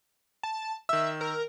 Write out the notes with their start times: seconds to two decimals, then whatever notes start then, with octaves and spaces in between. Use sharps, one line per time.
0.43 A5
0.89 D#3 E5 E6
1.21 A#4